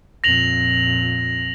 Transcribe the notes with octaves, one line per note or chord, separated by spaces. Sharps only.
F2 A#2 A#6 F7 F#7